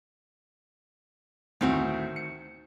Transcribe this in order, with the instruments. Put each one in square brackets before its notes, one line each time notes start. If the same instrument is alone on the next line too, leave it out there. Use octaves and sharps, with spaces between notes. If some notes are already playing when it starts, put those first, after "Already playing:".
[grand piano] D2 A2 [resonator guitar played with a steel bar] D#3 C4 F#4
[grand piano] C#7